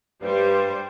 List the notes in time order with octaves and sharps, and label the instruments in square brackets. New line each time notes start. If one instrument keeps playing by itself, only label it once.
[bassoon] G2 [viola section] G3 C5